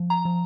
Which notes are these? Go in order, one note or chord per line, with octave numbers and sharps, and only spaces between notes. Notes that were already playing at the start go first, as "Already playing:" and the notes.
Already playing: F3
A#5
F3